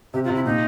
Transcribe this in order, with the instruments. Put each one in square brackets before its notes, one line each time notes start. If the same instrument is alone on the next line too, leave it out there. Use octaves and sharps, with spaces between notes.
[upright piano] C3 [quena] G4
[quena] F4
[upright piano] C3
[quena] E4
[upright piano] A#2 [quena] D#4